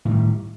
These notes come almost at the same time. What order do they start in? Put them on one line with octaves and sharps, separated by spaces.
A2 D#3 G3